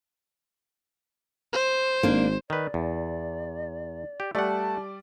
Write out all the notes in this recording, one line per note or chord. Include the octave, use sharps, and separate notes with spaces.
C5
G#1 A#3 D4
D#3 B4 D5
E2
G4
G3 A3 D5 F#5 A5